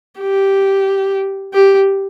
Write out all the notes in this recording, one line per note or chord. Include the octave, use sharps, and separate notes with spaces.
G4
G4